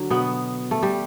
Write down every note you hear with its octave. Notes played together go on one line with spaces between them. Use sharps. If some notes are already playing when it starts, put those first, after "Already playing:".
Already playing: D3 F#3
B2 B3
A3
G3